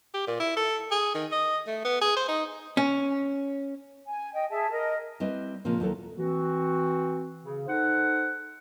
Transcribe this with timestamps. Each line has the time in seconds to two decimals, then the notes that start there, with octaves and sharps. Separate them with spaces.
0.14 G4
0.27 A#2
0.40 E4
0.57 A4
0.91 G#4
1.15 D#3
1.32 D#5
1.67 A3
1.85 B3
2.02 G#4
2.17 C5
2.28 D#4
2.77 C#4
4.06 G#5
4.33 D#5 G5
4.51 G#4 E5 A5
4.71 A#4 D#5
5.20 G3 C4 E4 B4 D#5
5.65 A#2 C#3 F3 G#3 A#3 C4
5.80 D#2 F#3 A3 E4 A4 A#4
6.17 E3 C4 F#4
7.42 C#3
7.67 D#4 A4 C5 F#5